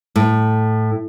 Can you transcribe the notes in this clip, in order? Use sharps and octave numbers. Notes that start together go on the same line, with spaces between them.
A2